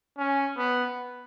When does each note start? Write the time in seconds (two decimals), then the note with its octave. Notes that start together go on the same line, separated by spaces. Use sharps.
0.18 C#4
0.57 B3